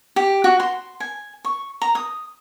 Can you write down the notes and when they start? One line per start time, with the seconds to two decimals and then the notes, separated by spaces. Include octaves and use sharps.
0.16 G4
0.44 F#4
0.60 C6
1.00 G#5
1.45 C#6
1.82 A#5
1.95 D#6